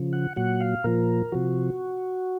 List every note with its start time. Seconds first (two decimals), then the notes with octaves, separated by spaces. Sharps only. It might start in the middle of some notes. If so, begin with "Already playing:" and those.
Already playing: C#3 F3
0.13 F#5
0.36 A#2 F#3 F#5
0.61 F5
0.84 A#2 F3 A#4
1.32 C3 F3 F#4